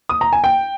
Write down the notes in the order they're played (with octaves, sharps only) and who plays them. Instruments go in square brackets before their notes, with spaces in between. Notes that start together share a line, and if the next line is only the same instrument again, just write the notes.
[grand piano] D#6
A#5
G#5
G5